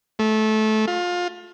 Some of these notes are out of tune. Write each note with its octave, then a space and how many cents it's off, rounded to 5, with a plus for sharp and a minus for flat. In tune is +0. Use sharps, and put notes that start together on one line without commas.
A3 -20
F4 +25